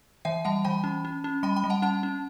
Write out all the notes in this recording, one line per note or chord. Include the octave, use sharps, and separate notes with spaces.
E3 E5 G5
G3 F#5 A5
E3 G5 B5
C#4
C#4
C#4
G3 G5 B5
G5 B5
G3
F#5 A5
C#4 F#5 A5
C#4